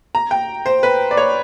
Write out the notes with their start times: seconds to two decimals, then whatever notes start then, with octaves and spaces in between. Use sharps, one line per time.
0.15 A#5
0.31 G5
0.66 C5
0.83 B4
1.11 D5
1.17 C#5